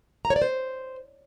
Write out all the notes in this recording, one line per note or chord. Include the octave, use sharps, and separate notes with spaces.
A#5
C#5
D5
C5